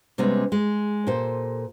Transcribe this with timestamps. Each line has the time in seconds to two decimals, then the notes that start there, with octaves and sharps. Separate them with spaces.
0.18 C3 G3 G#3 B3 C#4
0.52 G#3
1.07 A#2 G4 A4 C5